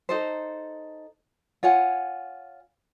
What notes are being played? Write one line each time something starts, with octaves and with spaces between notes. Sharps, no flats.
D#4 A4 C5
F4 C#5 F#5 G#5